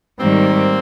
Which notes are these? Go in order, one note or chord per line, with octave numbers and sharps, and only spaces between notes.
G#2 D#3 G3 A#3 C4